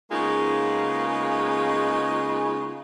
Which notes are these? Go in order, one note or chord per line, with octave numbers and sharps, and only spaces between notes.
C#3 G#3 A#3 B3 D#4 F4